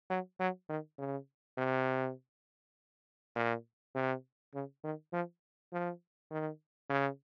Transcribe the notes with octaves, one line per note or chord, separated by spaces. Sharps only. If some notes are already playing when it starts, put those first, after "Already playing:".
F#3
F#3
D#3
C#3
C3
A#2
C3
C#3
D#3
F3
F3
D#3
C#3